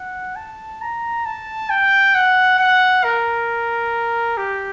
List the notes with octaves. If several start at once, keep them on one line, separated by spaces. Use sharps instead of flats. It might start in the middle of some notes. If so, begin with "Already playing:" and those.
Already playing: F#5
A5
A#5
A5
G5
F#5
F#5
A#4
G4